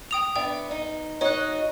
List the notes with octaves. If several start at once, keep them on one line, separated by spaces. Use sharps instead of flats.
G5 D#6 F7
B3 D4 E5 G5
D#4
D#4 F#4 C#5 D#5 F#6